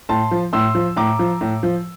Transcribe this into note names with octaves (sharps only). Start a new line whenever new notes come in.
A2 A5 C6
F3
A2 C6 E6
F3
A2 A#5 D6
F3
A2
F3